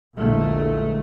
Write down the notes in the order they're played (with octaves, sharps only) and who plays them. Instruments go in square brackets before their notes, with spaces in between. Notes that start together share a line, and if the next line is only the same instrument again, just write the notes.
[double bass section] A#1 E2 A#2 D3 G#3 A3